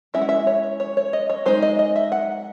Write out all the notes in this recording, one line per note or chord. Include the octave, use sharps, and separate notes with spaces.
G#3 C#4 E4 E5
F#5
E5
C#5
C#5
C#5
D#5
C#5
G#3 D#4 C5
D#5
D#5
E5
F#5